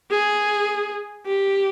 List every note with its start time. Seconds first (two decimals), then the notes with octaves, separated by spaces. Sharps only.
0.11 G#4
1.26 G4